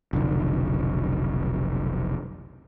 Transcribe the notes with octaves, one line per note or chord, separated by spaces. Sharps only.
F1 B1 D3